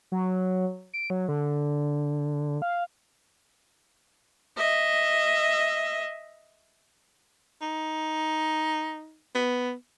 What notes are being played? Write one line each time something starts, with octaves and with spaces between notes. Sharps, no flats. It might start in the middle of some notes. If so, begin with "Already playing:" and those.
F#3
D7
F#3
D3
F5
D#5 E5
D#4
B3